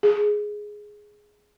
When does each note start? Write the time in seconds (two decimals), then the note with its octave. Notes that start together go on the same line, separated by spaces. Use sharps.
0.03 G#4